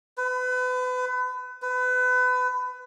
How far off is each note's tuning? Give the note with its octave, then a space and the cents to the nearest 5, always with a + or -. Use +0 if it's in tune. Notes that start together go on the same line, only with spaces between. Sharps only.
B4 +35
B4 +30